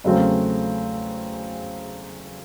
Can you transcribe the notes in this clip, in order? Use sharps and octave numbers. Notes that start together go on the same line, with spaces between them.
E2 C#3 F#3 A3 C4